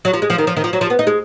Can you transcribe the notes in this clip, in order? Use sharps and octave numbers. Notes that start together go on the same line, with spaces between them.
F#3
F3
G#3
F3
D#3
F3
D#3
F3
F#3
F3
B3
D#4
G#3